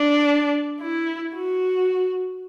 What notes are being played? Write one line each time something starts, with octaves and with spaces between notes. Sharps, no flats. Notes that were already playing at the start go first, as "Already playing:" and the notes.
Already playing: D4
E4
F#4